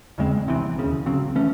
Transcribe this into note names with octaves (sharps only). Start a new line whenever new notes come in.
E2 C#3 G#3 C4
C2 C3 E3 C4
E1 D#2 C#3
C#2 C#3 F#3 C4
E3 A3 C#4